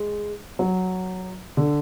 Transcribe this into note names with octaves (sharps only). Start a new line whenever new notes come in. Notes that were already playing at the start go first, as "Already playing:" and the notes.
Already playing: G#3
F#3
D3